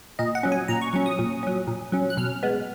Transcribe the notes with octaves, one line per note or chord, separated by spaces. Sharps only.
A#2 D#5
F#5
F#3 C#4
G#5
A#2 A#5
C#6
F#3 C#4 C#6
D#6
A#2
F#3 C#4
A#2
F#3 C#4
F#6
B2 F6
G#3 B3